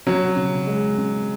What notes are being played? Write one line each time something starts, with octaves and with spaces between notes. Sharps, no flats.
F#3 C#4
C#3
G#3
C#4